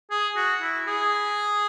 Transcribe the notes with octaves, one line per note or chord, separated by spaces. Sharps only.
G#4
F#4
E4
G#4